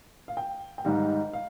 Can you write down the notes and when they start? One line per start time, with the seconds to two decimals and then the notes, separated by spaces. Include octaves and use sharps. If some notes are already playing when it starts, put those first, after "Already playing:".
0.28 F5
0.37 G5
0.78 G5
0.84 G#2 D#3 G3 F5
1.33 F5